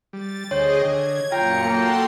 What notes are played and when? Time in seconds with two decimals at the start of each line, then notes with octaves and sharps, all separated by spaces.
0.13 G3 A6
0.51 D2 G#4 C5 C#5 D#5 G5
0.85 D3 G#6
1.32 F#2 A#2 F4 G5 A#5 C#7
1.63 A#3 F#4 A4 G5 C6